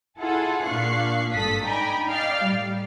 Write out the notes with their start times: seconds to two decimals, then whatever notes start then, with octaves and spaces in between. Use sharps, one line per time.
0.19 E4 F4 G#4 A4 F#5
0.66 A#2 D4 F5 C#6 F#6 C7
1.33 G#1 G2 A4 D#6 B6
1.64 D4 D#4 G5 G#5 A#5 B5
2.09 D5 D#5 F5 G5 F6 C7
2.43 A2 G3